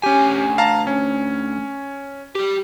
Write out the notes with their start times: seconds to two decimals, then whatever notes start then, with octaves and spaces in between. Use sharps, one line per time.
0.03 D2 C#4 G4 G#5
0.58 F5 A5 A#5
0.87 C#4
2.35 G3 G4